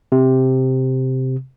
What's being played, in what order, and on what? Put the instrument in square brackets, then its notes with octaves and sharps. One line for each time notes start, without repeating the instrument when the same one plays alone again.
[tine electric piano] C3